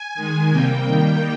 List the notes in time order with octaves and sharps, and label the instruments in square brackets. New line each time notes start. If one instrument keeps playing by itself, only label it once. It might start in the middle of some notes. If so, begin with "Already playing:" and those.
Already playing: [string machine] G#5
D#3 G#3
C3 G3 A#3 G5
D#3 G3 A#3 G5